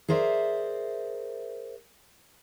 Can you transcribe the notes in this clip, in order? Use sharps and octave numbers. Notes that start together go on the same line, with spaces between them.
G#4 A#4 C5 D5 E5